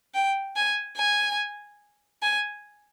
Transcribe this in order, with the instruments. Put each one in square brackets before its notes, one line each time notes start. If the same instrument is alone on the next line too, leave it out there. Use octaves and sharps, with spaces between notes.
[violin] G5
G#5
G#5
G#5